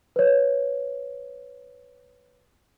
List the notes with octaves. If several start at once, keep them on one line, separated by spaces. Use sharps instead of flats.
B4 C#5